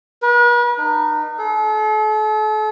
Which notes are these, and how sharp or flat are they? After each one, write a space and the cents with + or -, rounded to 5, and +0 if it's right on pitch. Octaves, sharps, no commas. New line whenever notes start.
B4 -45
D#4 -35
A4 -40